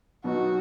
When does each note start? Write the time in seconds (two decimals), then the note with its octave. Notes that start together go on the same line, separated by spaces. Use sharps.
0.24 B2 F#3 B3 D#4 F#4